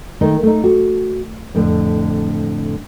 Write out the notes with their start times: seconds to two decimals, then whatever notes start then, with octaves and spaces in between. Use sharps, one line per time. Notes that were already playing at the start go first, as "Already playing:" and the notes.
0.21 D#3 A3 D#4
0.43 A3 D#4
0.64 F#4
1.55 F2 A2 D3